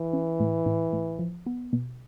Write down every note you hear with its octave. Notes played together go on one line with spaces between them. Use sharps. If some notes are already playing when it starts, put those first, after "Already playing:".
Already playing: E3
C#4
A2
A2
A2
F3
B3
B2